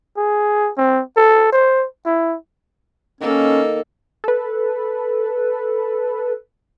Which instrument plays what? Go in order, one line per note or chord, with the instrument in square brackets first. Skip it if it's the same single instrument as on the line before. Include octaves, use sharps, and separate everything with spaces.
[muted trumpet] G#4
C4
A4
C5
E4
[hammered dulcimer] D#3 [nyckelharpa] A#3 A4 [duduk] C#4
[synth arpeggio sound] A4 B4